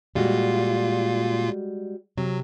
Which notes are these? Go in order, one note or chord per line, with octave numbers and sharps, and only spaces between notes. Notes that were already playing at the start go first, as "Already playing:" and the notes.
A#2 G3 G#3 F4 F#4
C3 F#3